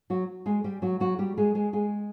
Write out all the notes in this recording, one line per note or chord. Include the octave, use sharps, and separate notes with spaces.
F#3 F#4
G#3 G#4
G3 G4
F#3 F#4
F#3 F#4
G3 G4
G#3 G#4
G#3 G#4
G#3 G#4